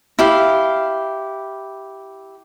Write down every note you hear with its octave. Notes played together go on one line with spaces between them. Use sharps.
E4 G4 F5